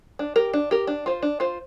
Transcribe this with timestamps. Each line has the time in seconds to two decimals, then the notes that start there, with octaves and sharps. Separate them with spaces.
0.19 D4
0.36 G4 A#4
0.54 D4
0.71 G4 A#4
0.87 D4
1.06 F4 C5
1.22 D4
1.40 F4 C5